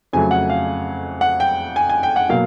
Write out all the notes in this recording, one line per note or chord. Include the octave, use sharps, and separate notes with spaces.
F2 C#3 F#3 A3 G#5
F#5
F5
F#5
G5
G#5
G#5
G5
F#5
B2 F#3 A#3 F5